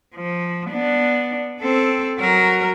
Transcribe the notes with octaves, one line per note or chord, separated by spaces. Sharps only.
F3
B3 D4
C4 A4
F#3 A#4